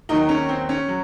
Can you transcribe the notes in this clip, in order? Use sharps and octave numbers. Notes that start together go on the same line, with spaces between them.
D#2 D#3 F#3 D#4
C#4
C4
C#4
F#3